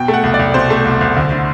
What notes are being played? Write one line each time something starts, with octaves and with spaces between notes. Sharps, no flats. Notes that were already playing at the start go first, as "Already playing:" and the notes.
Already playing: B2 G5
A3
F#5
C2
D5
C2
B2 C5
A3
C2
C2
D2
D3